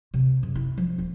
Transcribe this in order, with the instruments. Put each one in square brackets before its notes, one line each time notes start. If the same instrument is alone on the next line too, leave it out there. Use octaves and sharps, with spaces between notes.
[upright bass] C3
F#2
E4
F3
D#1